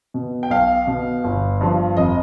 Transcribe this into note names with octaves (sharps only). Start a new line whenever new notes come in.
B2
G5
B1 F5
B2
G1
G2 F3
F1 D#5